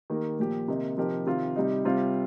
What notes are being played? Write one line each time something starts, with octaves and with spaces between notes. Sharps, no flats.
D#3 A#3 G4 A#4
A#2 F3 A#3 G4
C3 D#3 A#3 D#4
C3 F3 D#4 G4 A#4
C3 D#3 C4 F4
C3 G3 D#4
C3 G3 C4 F4